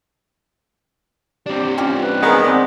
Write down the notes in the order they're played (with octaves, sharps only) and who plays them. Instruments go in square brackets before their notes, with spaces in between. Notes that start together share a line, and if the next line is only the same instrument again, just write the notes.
[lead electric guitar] C4 D4 [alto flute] G4
[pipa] C#4 G4 [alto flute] F4
[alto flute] B4
[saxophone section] D#3 G#3 B3 [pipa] E4 G#4 A#4
[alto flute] C4 [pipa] D5